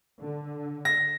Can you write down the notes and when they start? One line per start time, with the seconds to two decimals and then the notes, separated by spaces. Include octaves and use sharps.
0.20 D3
0.85 A#6